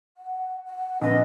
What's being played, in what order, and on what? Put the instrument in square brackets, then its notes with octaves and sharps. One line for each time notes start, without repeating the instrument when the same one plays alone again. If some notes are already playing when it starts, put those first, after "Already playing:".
[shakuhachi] F#5
F#5
[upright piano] A#1 B4 [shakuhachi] C4 [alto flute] D#5